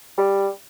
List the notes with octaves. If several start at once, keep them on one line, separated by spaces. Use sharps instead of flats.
G3